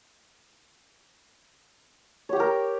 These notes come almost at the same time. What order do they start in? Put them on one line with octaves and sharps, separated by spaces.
C#5 G4 G5 A#4